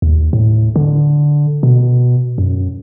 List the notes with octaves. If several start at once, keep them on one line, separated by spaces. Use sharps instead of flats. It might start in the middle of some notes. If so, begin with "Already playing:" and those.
D#2
A2
D3
B2
F#2